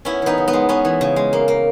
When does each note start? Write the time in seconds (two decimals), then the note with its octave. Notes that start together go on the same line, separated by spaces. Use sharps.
0.05 B3 C#4 E4
0.22 E3 B3 D#4
0.38 C#3
0.48 B3
0.53 G#3
0.69 B3 C#4
0.85 E3
1.01 C#3
1.16 G#3
1.33 A#3
1.48 A#3